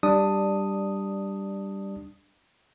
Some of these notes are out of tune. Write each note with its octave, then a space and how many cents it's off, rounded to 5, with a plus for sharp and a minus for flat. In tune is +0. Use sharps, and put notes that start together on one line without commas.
G3 +0 D4 +10 D#6 +0